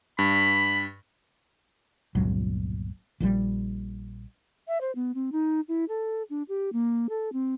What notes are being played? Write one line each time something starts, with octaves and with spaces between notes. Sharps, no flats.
G2 B5
G1 C#2 A#2 F#3
A#1 A#2 C#3 G3
E5
C5
B3
C4
D#4
E4
A4
D4
G4
A#3
A4
C4